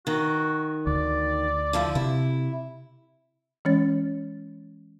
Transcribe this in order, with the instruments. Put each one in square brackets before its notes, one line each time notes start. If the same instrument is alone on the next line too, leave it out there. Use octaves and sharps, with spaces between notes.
[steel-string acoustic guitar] D#3 [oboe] F#4
[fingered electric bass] D2 [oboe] D5
[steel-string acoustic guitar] D3 F3 E4
[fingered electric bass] C3 [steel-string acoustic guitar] E4
[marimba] E3 G#3 C#4 C#5 A6